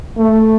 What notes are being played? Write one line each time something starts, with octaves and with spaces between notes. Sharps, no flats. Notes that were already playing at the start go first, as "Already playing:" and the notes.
A3